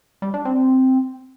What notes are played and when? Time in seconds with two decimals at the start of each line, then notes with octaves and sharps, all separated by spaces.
0.22 G3
0.34 D4
0.45 C4